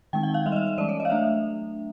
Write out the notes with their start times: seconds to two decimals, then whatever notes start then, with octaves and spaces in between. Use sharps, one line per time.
0.13 D#3 G#3 C4 D#4 G5
0.23 F#5
0.34 F5
0.46 G3 B3 D#4 E5
0.52 D#5
0.56 E5
0.67 D#5
0.77 E3 G#3 C#4 D5
0.89 C#5
1.00 D#5
1.05 F5
1.10 F#3 A3 D4 E5